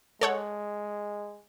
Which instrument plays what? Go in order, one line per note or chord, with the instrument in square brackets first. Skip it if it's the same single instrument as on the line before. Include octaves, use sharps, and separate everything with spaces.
[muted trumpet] G#3 [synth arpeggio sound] A4 C#5 F#5